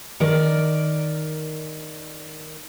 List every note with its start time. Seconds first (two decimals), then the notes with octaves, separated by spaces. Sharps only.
0.20 D#3 A#4 D5